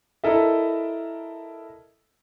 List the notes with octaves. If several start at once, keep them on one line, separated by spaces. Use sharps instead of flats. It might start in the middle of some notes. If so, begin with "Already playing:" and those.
E4 A4 A#4 D#5 E5